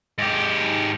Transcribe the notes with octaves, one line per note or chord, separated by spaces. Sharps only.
G#2 G4